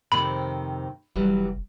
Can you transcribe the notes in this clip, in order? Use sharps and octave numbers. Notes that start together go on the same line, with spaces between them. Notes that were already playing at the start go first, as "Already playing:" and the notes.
F2 C3 D#3 B5
F1 E3 F#3 G3